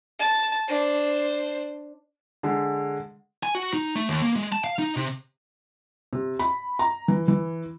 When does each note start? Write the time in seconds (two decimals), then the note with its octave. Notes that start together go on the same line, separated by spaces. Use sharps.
0.19 A5
0.68 D4 C5
2.43 D3 G#3
3.43 G#5
3.55 F#4
3.74 D#4
3.95 A3
4.08 D#2
4.22 A#3
4.36 G#3
4.52 A5
4.64 F5
4.79 D#4
4.96 C3
6.13 C3
6.39 B5
6.79 A#5
7.08 E3
7.28 E3